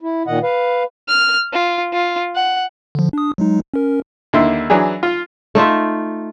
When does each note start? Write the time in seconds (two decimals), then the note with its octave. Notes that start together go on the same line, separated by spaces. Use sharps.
0.01 E4
0.27 A#2 D#3 D#5 F#5
0.43 B4 F5
1.08 F6
1.53 F4
1.93 F4
2.35 F#5
2.95 D3 F3
3.13 D4 D#6
3.38 F#3 G#3 D#4
3.74 C#4 A#4
4.33 D#2 D3 E4 C6
4.70 E3 F#3 D4 G#4
5.03 F4
5.55 A3 D#4 F4 E5